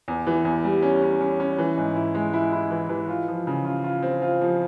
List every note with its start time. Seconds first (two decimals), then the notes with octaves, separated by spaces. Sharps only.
0.08 E2
0.27 E3
0.45 E2
0.64 G3
0.82 C#4
1.02 C#4
1.21 C#4
1.40 C#4
1.59 E3
1.78 G#2
1.95 E4
2.15 G#3
2.33 E4
2.52 E4
2.71 E3
2.89 E3
3.08 F4
3.28 F3
3.47 C#3
3.65 F4
3.84 F4
4.02 C4
4.22 F4
4.41 F3